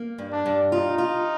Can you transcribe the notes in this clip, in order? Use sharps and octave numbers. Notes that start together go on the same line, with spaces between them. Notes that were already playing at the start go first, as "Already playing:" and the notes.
Already playing: A#3
G2
D4
G2
D#4 F4
F4